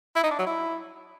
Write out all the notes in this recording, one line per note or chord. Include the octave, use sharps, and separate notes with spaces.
E4
D#4
D4
F#3
E4